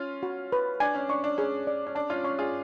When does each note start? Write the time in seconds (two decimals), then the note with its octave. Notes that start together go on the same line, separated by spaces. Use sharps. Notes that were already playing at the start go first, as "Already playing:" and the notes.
Already playing: C#4 F4
0.23 F#4
0.52 B4
0.80 D4 G#5
0.95 C#4
1.09 D4 C#6
1.24 D4
1.38 C#4 G#4
1.67 D5
1.87 C#4
1.95 D4 A5
2.10 C#4 F4
2.24 C#4 C#6
2.39 F4 G#4